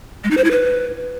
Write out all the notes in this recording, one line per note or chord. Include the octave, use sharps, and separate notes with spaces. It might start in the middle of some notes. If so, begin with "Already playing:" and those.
G#3
D#4
C5
E4
B4